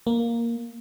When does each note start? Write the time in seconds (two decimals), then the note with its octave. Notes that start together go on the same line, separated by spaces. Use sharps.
0.07 A#3